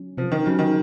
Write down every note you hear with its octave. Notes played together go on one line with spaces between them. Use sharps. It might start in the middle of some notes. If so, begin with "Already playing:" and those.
Already playing: F#3 C#4
C3 F3
D#3
C#3 F#3
D#3